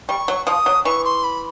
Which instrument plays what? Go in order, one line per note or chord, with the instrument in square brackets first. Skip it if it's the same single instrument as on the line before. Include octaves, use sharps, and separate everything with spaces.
[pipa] G3 [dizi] C#6
[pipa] F#3
[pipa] F3 [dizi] D#6
[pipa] F#3
[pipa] E3 [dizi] C#6
[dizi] C6
B5